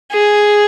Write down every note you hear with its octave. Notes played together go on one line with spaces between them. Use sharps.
G#4